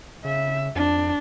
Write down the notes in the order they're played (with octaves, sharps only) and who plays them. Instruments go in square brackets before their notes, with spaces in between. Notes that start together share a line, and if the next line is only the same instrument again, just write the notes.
[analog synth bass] C#3 [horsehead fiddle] E5
[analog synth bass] F2 [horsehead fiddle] D4